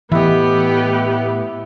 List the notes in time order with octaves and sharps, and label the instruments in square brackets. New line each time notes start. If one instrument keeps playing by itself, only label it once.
[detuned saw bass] A2 [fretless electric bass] E3 [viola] B3 G4 [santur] E4 D#5